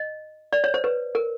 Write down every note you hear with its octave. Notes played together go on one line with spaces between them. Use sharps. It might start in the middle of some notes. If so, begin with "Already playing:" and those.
Already playing: D#5
D5
C#5
C5
B4
A#4